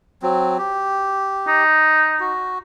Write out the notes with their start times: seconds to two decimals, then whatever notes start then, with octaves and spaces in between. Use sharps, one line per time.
0.22 F#3 C4
0.58 G4
1.48 D#4
2.20 F#4